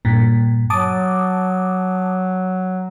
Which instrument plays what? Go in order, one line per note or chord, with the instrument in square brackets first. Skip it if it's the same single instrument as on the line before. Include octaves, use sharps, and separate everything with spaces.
[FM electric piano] G2 A#2
[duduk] F#3 [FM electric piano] A5 D6 D#6